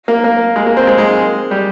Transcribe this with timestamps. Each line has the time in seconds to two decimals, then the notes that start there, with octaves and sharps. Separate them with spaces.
0.08 A#3
0.24 A#3
0.56 G#3
0.66 A#3
0.77 C4
0.87 G#3
0.98 G#3
1.51 G3